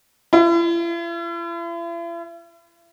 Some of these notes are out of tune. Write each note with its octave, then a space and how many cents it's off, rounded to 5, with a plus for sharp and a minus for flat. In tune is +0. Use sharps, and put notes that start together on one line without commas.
E4 +45